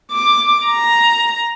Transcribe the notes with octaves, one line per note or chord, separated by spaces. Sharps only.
D6
A#5